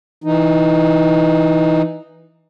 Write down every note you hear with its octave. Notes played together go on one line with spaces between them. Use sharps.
E3 D#4